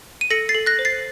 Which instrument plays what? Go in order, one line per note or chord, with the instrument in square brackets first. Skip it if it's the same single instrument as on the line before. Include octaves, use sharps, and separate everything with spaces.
[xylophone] D#7
A4 A#6 C#7
A6 C7
A4
F#6 A#6
C5
A6 C7